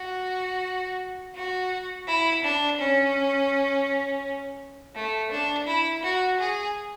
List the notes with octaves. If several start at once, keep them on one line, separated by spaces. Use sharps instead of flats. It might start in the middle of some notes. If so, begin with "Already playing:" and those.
Already playing: F#4
F#4
E4
D4
C#4
A3
D4
E4
F#4
G#4